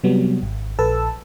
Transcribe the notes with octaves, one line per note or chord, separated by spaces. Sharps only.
C3 F#3 G3 B3
G#1
A#1 A4 B4 A5 E6